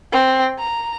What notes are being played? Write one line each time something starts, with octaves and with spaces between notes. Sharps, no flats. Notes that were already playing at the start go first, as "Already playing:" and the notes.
C4
A#5